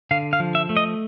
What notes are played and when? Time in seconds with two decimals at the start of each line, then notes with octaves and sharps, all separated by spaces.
0.11 D3 F5
0.33 F5
0.40 F3
0.55 E5
0.69 A3
0.77 D#5